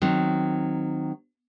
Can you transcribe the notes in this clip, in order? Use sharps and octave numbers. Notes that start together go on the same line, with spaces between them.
D#3 F#3 C4